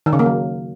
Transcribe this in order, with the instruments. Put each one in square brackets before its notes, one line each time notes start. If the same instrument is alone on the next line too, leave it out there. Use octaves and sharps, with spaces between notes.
[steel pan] D#3
C#3
A#3
F#3